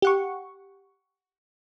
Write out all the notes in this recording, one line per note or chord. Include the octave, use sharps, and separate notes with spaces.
G4 F#5 C#6